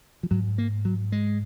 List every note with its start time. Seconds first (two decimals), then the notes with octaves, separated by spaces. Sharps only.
0.23 F3
0.31 G#2 F#3
0.58 A#3
0.85 F#3
1.12 G#3